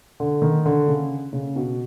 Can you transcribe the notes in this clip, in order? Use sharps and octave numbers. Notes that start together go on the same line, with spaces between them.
D3
D#3
D3
C#3
C#3
B2